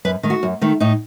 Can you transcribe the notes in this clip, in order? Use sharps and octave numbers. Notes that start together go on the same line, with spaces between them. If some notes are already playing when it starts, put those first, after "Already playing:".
F#2 B4
D#3 A3
F#4
F#2
D#3 A3
A2 D#4